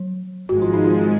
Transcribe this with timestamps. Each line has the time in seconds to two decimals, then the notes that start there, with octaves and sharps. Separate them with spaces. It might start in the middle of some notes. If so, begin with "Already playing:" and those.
Already playing: F#3
0.49 G#1 G#2 F3 G#3 F#4
0.62 F4
0.74 D#4
0.84 F4